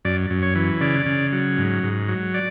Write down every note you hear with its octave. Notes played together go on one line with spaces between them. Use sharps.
F#2 D5
F#2
C#5
E3
C#3 D5
C#3
F#3
G#2
G#2
F#3
D5